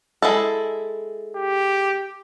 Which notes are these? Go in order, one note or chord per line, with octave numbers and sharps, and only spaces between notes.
G#3 E4 A4
G4